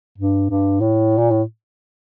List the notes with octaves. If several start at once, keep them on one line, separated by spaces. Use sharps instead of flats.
G2
G2
A2
A#2
A2